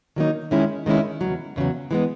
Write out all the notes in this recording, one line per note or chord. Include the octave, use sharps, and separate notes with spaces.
D#3 F#3 A#3 D#4
D#3 G#3 C#4 E4
D#3 G#3 C#4 E4
E2 C#3 F#3
E2 C#3 F#3
E3 G#3 B3